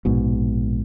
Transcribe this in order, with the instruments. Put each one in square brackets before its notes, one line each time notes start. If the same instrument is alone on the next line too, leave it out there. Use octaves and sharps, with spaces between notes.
[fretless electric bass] A#1 G#2 B2